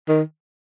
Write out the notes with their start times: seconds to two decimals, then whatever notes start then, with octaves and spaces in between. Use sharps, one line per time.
0.09 D#3